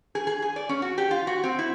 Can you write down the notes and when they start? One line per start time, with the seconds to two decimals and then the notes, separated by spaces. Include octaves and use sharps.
0.15 G#4
0.27 G#4
0.42 G#4
0.56 D5
0.69 C#4
0.82 F#4
0.98 G4
1.11 F4
1.27 F#4
1.44 C4
1.59 E4